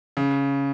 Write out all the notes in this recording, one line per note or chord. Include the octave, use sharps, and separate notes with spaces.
C#3